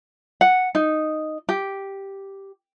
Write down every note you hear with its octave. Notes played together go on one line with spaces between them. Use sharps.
F#5
D#4
G4